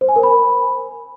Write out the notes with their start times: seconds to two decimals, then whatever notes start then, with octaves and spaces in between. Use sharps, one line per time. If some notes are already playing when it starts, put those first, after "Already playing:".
0.01 C5
0.09 G#5
0.16 A#4
0.23 B5